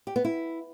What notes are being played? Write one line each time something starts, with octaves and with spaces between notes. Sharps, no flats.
G4
B3
E4